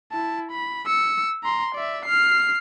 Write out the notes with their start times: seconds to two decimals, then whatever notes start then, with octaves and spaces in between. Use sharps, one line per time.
0.12 E4 A5
0.51 B5
0.86 E6 C#7
1.44 A#5 C6
1.75 D5 E5
2.05 F6 C7